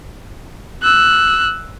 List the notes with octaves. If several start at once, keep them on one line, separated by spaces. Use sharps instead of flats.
E6 F#6